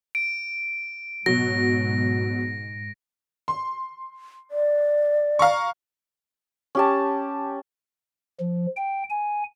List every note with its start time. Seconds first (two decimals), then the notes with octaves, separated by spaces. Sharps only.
0.15 D7
1.26 G#2 B2 F#3 A#6
3.48 C6
4.51 D5
5.39 F5 A#5 C#6
6.75 C#4 G4 A5
8.40 F3
8.76 G5
9.10 G#5